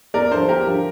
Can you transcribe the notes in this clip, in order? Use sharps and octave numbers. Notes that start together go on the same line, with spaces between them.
E2 A#4 D5
D3 F3 A4 C5
E2 G4 A#4
D3 F3